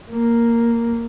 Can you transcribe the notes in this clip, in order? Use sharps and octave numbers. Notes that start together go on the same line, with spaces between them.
A#3